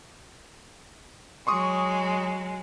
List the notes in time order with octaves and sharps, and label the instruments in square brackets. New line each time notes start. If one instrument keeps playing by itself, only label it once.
[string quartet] F#3 G#3 [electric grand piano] C6 C#6 D#6